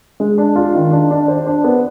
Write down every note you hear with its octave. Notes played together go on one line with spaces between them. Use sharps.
G#3
D4
F4
D#3
D4
D4
C5
D4
B3